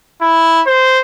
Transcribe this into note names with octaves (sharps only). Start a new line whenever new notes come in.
E4
C5